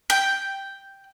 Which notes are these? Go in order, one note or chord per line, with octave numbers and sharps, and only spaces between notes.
G5